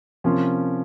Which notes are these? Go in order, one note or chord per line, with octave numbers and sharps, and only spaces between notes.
C3 F3 A#3 C#4 F4